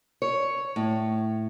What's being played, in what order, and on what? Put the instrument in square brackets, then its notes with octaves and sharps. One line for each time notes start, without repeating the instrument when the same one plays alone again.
[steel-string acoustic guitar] C#5
A2